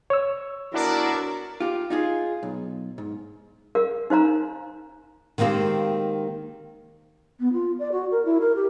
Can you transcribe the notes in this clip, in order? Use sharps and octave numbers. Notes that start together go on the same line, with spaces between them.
C#5 E6
B3 D4 E4 F#4 A#4 D5
F4 G4
D#4 F4 G#4
B1
G#2
A#4 F5
D#4 C5 F5 A#5
D#3 G#3 A#3 C4 G4
B3
F4
D5
F#4
A#4
E4
A#4
G4